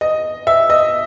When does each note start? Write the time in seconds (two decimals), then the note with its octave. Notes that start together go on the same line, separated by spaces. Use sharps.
0.01 D#5
0.47 E5
0.70 D#5